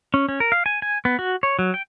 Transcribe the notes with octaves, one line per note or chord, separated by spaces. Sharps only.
C#4
C#4
A#4
F5
G#5
G#5
B3
F#4
C#5
F#3
G5